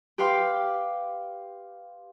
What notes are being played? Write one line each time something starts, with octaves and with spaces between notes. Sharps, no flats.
G4 B4 F5 G5 C6 D6